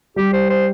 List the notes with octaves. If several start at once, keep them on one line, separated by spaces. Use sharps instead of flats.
G3 G4
C5
C5